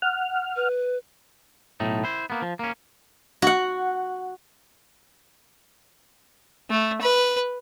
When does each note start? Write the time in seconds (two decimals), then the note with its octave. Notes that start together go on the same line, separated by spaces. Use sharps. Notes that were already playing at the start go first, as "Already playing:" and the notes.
0.02 F#5 F6
0.56 B4
1.80 B1 A2 A3 D#4
2.04 E4 C5
2.30 A#3 B3
2.42 F3
2.59 A#3 C#4
3.42 F#4 F#5
6.70 A3
7.01 B4